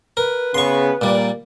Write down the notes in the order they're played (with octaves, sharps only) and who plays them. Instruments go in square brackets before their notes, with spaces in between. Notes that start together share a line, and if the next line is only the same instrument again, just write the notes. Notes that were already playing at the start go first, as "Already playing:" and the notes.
[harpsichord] A#4 [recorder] B4
[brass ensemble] C#3 B3 [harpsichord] C6 C#6
[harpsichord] A#2 G3 [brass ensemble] A#3 D5